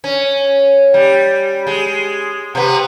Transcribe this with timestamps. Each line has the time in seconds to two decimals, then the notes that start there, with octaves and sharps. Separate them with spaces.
0.04 C#4
0.94 G3
1.67 G#3
2.55 C3 B3